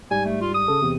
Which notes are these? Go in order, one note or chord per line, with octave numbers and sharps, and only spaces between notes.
G#2 G3 G#5
A3
F4
D#6
C#3 A4
E2 C3